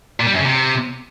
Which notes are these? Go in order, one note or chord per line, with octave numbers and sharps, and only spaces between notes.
A#2
G3
F#2
C#3
C3